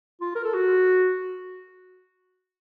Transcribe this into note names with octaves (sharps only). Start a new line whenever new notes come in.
F4
A#4
A4
F#4